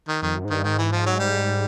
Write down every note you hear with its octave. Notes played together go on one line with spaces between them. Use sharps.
D#3
F2 D#3
F#2
G#2
G2 D#3
G#2 D#3
E3
F3
F#3
G3